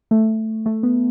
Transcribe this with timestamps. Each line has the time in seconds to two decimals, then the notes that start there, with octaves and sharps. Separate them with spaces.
0.11 A3
0.66 A3
0.83 B3